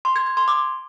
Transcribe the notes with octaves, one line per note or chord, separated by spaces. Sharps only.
C6
G#6
G#6
C6
D6